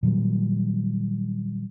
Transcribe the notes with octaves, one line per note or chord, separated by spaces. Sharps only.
A#2 D#3 F#3 G3